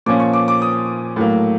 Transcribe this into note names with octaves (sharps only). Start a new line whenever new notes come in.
A#2 F3 A#3 C#4 D6
C#6
D6
D6
D#6
A2 F#3 A#3